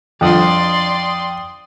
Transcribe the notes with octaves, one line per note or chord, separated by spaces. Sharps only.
F2 G3 D4 F4 D5 G5 C6 D#6